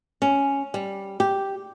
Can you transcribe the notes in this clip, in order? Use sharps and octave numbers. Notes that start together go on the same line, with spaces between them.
C#4
G3
G4